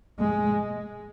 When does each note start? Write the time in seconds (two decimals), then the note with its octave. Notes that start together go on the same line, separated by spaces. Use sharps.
0.19 G#3